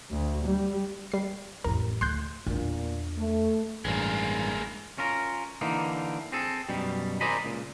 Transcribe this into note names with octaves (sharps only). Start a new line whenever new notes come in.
D2
G3
G3 C7
A1 F2 A#4
D2 C6 F#6 G6
E2 A#2 D4
A3
A1 G2 G#3 A#3
C#4 F4 A#4
D3 E3 A#3 D#4
C4 G#4 A4
F#2 B2 G3
A#4 C5 D5 D#5 G#5 B5
C#2 A#2